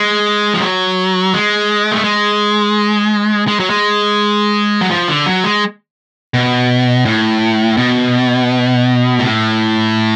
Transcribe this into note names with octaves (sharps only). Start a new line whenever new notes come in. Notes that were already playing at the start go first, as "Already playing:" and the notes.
Already playing: G#3
F3
F#3
G#3
A3
G#3
G#3
F#3
G#3
F#3
F3
D3
F#3
G#3
B2
A2
B2
A2